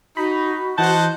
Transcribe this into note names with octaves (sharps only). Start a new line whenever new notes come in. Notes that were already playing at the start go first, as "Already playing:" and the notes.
D#4 F#4 B5
E3 C5 D#5 F#5 A5 G6